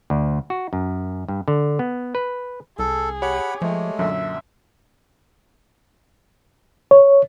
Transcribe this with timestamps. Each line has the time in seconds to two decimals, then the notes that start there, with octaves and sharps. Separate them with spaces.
0.10 D2
0.50 F#4
0.73 F#2
1.28 G2
1.48 D3
1.79 B3
2.15 B4
2.79 C2 G#4 A4
3.22 G4 C#5 F#5 B5
3.62 F3 G#3 A3
3.99 F#2 A#2 D3 F#3 E5
6.91 C#5